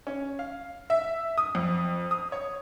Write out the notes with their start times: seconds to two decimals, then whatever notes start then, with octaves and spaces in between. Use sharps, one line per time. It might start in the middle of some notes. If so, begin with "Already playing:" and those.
0.07 C#4
0.39 F5
0.90 E5
1.38 D#6
1.55 F2
2.11 D#6
2.32 C#5